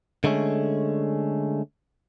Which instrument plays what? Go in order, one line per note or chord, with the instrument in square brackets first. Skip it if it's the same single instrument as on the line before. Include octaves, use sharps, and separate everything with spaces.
[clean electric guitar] D3 G#3 A3 C#4